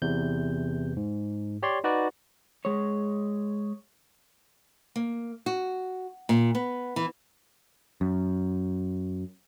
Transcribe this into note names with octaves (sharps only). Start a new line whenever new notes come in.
E2 C3 G6
G#2
G4 C#5 D5 C6
D#4 F#4 B4 D5
G#3 C#5
A#3
F#4
A#2
B3
E3
F#2